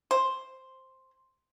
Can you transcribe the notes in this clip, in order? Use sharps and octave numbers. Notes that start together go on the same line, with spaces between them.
C5